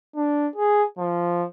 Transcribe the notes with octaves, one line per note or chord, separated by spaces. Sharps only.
D4
G#4
F3